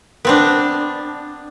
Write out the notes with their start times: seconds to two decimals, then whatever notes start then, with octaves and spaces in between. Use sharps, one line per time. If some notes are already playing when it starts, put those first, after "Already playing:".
0.25 B3 C4 D4